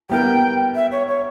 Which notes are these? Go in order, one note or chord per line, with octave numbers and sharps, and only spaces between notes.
G3 B3 E4 A#4 G5
E5
C#5
C#5